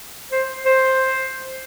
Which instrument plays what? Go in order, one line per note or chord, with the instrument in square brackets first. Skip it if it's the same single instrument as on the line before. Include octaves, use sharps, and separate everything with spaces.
[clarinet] C5
C5